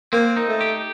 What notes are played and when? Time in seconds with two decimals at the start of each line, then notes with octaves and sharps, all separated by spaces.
0.13 A#3 C4
0.36 D#4
0.48 A3
0.61 G4